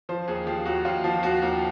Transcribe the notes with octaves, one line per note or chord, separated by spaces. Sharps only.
F3 C5
D#2 G#4
F3 G4
D#2 F#4
D#2 F4
F3
D#2 F#4
D#2